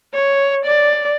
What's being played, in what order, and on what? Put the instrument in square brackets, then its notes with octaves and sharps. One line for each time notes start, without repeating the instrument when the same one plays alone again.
[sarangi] C#5
D5